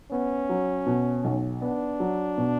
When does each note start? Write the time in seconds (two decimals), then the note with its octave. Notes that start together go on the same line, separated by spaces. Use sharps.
0.11 B3 C#4
0.49 F#3
0.86 B2
1.24 B1
1.62 B3 D4
2.00 F#3
2.38 B2